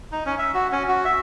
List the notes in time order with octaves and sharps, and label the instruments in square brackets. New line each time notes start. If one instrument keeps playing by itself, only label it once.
[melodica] D#4
C#4
E5
F#4
C#4
F#4
E5